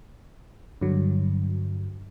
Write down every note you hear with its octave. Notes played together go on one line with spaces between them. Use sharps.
G2 D3 F#3